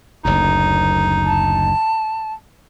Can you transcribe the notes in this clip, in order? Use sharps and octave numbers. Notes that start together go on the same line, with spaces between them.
F#1 D2 D#4
A5